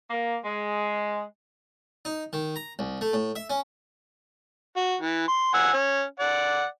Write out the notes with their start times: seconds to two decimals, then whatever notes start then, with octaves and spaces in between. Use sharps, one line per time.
0.10 A#3
0.44 G#3
2.05 D#4
2.33 D#3
2.56 A#5
2.79 C2
3.01 A3
3.13 A2
3.36 E5
3.50 C#4
4.76 F#4
5.01 E3
5.28 C6
5.54 F#5 G#5 E6
5.73 C#4
6.20 D5 F#5